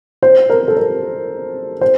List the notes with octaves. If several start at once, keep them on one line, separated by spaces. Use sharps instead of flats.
C5
A#4
A4
A#4
C5